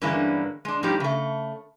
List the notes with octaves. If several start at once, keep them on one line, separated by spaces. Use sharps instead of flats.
G2 D3 E3 G#3 A#3 C#4
G#3 D4
A2 F3 G3 D#4 G4
C#3 A3